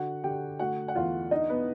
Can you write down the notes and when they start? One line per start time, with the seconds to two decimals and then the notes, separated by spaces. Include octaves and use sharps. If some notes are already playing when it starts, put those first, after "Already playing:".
Already playing: D3 F#4 F#5
0.24 D3 G4 G5
0.59 A3 F#4 F#5
0.88 F#5
0.95 E2 F4 F5
1.31 D4 D#4 D#5
1.49 B3 B4